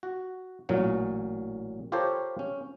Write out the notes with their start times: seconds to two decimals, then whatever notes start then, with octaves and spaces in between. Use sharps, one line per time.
0.03 F#4
0.69 A1 A#2 F#3 C#4
1.92 F4 G4 A4 A#4 C5 C#5
2.39 C#4